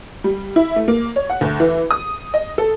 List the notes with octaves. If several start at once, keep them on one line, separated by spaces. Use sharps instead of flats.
G3
E4
A3
A#3
C#5
F#5
D2
E3
D#6
D#5
A4